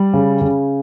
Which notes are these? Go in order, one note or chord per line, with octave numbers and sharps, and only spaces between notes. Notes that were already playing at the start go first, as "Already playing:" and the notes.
Already playing: G3
C#3
C#3